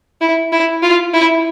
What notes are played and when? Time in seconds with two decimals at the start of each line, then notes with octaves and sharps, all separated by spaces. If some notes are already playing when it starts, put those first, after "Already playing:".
0.21 E4
0.52 E4
0.82 F4
1.13 E4